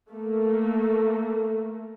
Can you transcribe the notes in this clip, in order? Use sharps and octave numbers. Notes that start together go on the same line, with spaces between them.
A3 A#3